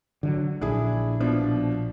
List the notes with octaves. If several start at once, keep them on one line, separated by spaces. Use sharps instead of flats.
D3 F3 F#3
A#1 D4 E4 G#4
B2 F3 D4